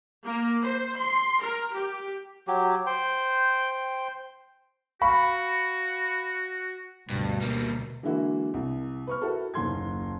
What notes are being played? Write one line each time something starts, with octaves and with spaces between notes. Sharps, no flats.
A#3
C5
C6
A#4
G4
F#3 G4
C5 G5
F#4 F5 B5 C#6
D2 G2 B2
G3 A#3
D3 E3 G#3 A#3 E4 F#4
C2
B4 C#6 F6
E4 F#4 A4 A#4
F#1 D#2 C6 G#6